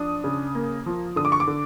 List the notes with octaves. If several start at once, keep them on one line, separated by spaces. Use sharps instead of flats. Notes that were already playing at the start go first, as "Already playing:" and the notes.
Already playing: F3 D4 D#6
C#3
A#3
F3
D3 D#6
D6
C#6
D6
D3